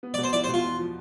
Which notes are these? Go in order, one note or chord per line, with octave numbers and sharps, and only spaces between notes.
B3
D5
B2
C5
E4 D5
C5
B2
F4
E2
F3